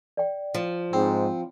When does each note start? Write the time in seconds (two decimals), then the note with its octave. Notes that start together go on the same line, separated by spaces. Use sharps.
0.17 D5 G5
0.54 F3
0.93 G#2 C4 G5 B5